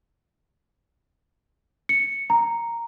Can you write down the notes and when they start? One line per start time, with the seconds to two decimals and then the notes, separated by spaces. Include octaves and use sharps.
1.89 C#7
2.30 A#5